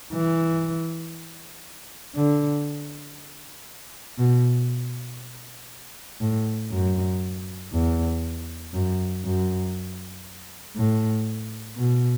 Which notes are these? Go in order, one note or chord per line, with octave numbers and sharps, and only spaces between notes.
E3
D3
B2
A2
F#2
E2
F#2
F#2
A2
B2